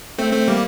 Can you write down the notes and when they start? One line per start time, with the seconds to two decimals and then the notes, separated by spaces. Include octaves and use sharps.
0.18 A3 C4
0.33 A3 C4
0.48 G3 A#3